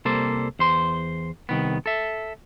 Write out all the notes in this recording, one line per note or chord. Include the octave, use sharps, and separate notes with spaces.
C2 G3 A#3 A4 C5
E2 C5 C6
C2 D#3 B3
A4 E5